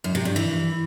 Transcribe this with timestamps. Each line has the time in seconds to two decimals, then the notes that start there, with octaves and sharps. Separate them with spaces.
0.04 F#2
0.15 C3
0.25 G2
0.36 E3